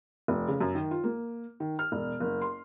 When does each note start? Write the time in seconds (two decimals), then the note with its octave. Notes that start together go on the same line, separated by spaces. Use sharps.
0.28 F1
0.48 C#3
0.61 F#2
0.75 D#3
0.91 F4
1.04 A#3
1.60 D#3
1.79 F6
1.92 E1
2.20 F#1
2.42 C6